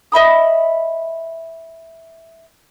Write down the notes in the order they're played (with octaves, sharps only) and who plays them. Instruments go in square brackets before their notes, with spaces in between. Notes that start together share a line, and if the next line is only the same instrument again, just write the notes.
[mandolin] D#5 E5 B5 D#6